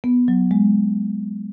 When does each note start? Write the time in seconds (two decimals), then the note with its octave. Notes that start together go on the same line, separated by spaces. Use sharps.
0.04 B3
0.28 F#3
0.51 G#3